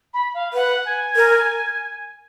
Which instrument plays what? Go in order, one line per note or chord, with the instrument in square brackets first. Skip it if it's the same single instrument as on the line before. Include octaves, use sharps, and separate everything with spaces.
[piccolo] B5
F5
[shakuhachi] B4 [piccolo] F#5
[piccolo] G#5
[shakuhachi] A#4